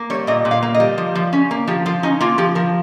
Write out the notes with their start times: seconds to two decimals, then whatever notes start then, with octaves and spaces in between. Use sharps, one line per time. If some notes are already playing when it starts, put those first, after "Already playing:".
Already playing: A#3
0.10 G3 C#5
0.27 A#2 D#5
0.45 A#2
0.51 F5
0.63 A#3
0.74 D#5
0.80 G3
0.98 F3
1.15 F3
1.33 C#4
1.51 A#3
1.68 F3 G4
1.86 F3 F4
2.03 C#4 D#4
2.20 A#3 F4
2.38 F3 G4
2.55 F3 A#4